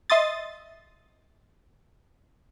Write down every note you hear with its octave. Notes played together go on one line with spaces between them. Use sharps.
D#5 E5 C6 D#6 A6